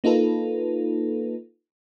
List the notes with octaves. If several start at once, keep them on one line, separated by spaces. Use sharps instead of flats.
A#3 D#4 F4 A4 B4